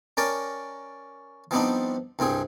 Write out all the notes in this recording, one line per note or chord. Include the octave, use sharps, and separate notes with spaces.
C#4 A#4 D5 G5 A5
F3 G3 B3 C4 D4 D#4
C2 G2 C4 G#4